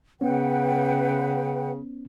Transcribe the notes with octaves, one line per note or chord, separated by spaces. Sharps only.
C#3 B3 C#4 B4 F#5 G5